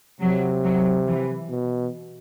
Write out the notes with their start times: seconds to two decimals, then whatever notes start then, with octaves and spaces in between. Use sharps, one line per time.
0.21 C3 F#3
0.63 F#3
1.06 E3
1.50 B2